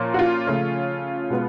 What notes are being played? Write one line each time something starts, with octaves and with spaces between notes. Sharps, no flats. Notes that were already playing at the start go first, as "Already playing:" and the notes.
Already playing: A#2 F3 A#3 C#4
F#4
F4
C#3 F3 A3 C#4
B2 G#3 B3